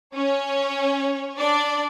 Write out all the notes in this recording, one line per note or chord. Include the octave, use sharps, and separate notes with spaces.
C#4 C#5
D4 D5